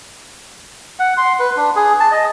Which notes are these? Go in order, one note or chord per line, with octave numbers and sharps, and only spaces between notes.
F#5
C6
B4
D4
G#4
A5
D#5